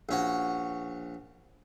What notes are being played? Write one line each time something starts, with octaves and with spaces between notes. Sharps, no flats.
A#1 C#4 F#4